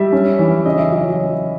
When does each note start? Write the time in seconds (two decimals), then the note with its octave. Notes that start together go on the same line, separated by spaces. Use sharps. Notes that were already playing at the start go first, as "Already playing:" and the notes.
Already playing: G3 E5
0.12 C#4
0.39 E3
0.66 C#3 D#5
0.78 E5
0.92 F#3 D#5